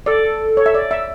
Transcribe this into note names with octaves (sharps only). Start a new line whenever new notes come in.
A4 D5
C#5
E5
D5
E5